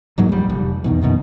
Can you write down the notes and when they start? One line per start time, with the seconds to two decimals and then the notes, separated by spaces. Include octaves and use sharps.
0.18 D1 G#2 F#3 A#3
0.32 A#1 G3
0.50 F1
0.84 E2 B2 D#3
1.01 A#1 F#2 B2 D#3